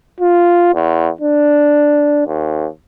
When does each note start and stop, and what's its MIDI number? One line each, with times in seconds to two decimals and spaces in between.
0.20 0.70 65
0.74 1.09 40
1.21 2.26 62
2.27 2.67 39